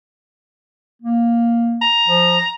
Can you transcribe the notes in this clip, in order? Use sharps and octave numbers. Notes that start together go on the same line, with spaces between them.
A#3
A#5
F3